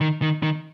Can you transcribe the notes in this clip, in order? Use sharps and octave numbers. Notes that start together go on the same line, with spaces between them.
D#3
D#3
D#3